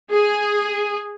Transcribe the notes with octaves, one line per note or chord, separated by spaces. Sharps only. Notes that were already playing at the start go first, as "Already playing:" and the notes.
G#4